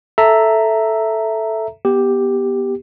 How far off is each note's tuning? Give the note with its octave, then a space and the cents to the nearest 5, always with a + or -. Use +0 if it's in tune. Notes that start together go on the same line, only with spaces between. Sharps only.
A4 -5 E5 +0 A#5 -10
B3 -15 G4 +0